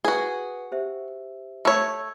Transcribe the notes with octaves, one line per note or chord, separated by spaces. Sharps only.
F#4 G#4 B4
G4 C5 E5
A3 C#5 E6 G#6